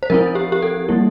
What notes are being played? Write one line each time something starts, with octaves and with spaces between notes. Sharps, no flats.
C5
F3 C4 E4 A#4
G4
G4
A4
G3 A#3 E4